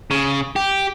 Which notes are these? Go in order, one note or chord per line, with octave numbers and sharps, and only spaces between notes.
C#3
G4